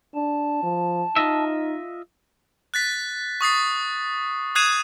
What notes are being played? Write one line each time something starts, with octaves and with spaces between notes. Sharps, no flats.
D4 A5
F3
D#4 F4 D#5 E5
F#6 A6 B6
C#6 D#6 A6 C7
D#6 F#6 G#6 C7 D#7 E7